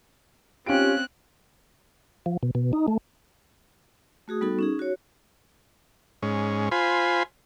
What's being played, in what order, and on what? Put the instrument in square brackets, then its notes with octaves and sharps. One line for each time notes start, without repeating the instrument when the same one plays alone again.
[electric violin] C4 F#6 [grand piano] C#4 F5 D7 [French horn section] D#4 F4 G4
[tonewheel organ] F3
B2
B2
D#4
A3
[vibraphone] A3 F#4 G#4 D#6
G3 B3 D#4 F#4 A4
C#4 D#4 G#4
F#4 C#5
[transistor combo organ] G#2 C#4
F4 C5 G#5 B5